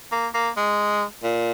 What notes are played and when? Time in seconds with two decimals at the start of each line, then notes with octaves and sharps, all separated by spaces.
0.12 A#3
0.34 A#3
0.56 G#3
1.23 A#2